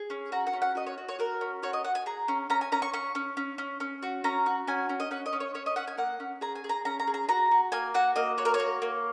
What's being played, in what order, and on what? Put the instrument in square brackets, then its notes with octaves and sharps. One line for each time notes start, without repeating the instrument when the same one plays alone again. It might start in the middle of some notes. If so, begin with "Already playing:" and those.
Already playing: [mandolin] G#4
C#4
F#4 A#5
F#5
C#4
F#5
F#4 D#5
C#5
F#4
C#5
F#4 A#4
C#4
F#4 C#5
D#5
F#4 F#5
G#5
G#4 A#5
C#4
C#4 A#5
G#5
C#4 A#5
C#6
C#4 C#6
C#4
C#4
C#4
C#4
F#4
C#4 A#5
F#4
C#4 G#5
C#4
D#5
C#4 F#5
D#5
C#4
C#5
C#4 C#5
D#5
C#4 F#5
G#5
A#3 F#5
C#4
G#4 A#5
G#5
G#4
A#5
C#4 A#5
A#5
G#4
A#5
F#4 A#5
F#4
A#3 G#5
F#4 F#5
A#3 D#5
F#4 C#5
A#4
C#5
A#3
A#3